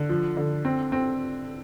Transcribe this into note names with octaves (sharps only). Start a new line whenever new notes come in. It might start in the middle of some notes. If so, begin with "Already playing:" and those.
Already playing: D3
F3
D3
C4
C4